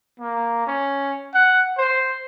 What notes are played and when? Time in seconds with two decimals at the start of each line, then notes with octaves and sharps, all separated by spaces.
0.20 A#3
0.67 C#4
1.34 F#5
1.78 C5